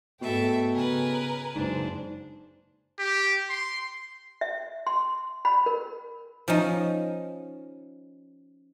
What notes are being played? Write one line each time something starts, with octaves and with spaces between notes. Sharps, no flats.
G#2 B2 A3 A4 E5 G5
C#3 A#4 B4 G#5
F#1 G#2 D4 C5
G4
C6
E5
C6
B5
A#4
F3 C#4 D#4